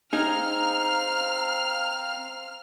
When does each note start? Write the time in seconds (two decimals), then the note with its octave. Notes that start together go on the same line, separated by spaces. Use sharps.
0.13 C4 D#4 G#4 F5 A#5 F6